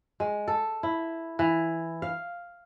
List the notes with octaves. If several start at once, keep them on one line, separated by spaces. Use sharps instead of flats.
G#3
A4
E4
E3
F5